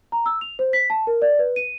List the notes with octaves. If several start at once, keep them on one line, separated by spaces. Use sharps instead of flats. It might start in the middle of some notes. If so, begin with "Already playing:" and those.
A#5
E6
F7
C5
B6
A5
A#4
D5
B4
D#7